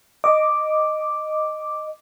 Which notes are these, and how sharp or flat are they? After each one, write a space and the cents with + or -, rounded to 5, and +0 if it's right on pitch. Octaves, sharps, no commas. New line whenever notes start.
D#5 -5 D6 +0